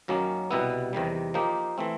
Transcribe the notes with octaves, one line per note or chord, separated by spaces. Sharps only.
F#2 D#3 F#3 A#3 C#4
C2 B2 G3 B3 E4
E2 C3 D#3 G3
F3 A#3 D#4 G4
E3 A3 C4